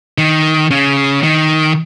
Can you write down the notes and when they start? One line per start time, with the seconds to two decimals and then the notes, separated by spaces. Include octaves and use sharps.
0.18 D#3
0.71 C#3
1.24 D#3